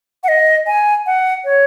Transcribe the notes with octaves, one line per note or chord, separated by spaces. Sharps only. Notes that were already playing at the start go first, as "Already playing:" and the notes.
F#5
D#5
G#5
F#5
C#5